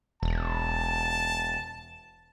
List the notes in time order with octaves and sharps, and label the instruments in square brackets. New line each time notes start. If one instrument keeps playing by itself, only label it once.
[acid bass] E1 [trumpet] A5